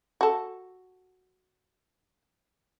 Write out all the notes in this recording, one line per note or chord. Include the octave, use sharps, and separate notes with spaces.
F#4 A4